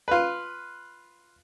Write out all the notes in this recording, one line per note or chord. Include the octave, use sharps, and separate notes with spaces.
F4 B4